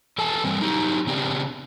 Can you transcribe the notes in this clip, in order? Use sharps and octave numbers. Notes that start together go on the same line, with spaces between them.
E2 A4 G#5 A5
E3 G3 C4
F#3 D#4 G4
C#3 B3 C4 D4 G4